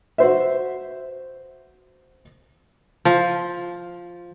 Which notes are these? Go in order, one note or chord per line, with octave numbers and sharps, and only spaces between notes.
F#4 C5 E5
F3